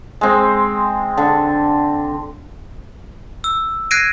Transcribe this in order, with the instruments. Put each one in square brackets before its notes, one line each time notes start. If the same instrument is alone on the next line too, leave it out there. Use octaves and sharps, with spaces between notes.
[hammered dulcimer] G#3 C4
D3
[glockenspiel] E6
F#6 G#6 A#6 C7 D7 D#7